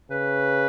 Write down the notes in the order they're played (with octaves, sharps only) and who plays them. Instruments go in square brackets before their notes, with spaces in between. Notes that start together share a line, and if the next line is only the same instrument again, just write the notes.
[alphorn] C#3 [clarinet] B4